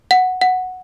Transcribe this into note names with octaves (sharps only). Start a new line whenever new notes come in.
F#5
F#5